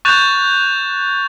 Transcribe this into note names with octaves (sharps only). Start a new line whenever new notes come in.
C#6 F#6 G6 A6 E7 F7